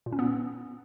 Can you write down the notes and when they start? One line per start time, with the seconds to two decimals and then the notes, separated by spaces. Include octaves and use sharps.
0.06 A#2
0.12 C#4
0.19 B3